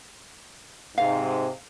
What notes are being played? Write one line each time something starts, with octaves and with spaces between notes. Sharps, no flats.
G#2 C3 F5